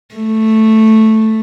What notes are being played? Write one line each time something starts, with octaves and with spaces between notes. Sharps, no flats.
A3